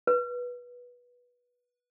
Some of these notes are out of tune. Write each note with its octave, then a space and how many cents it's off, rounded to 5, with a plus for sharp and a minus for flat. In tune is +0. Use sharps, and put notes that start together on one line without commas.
B4 -15